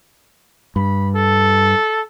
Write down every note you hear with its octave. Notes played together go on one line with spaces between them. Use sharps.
G2 B5
A4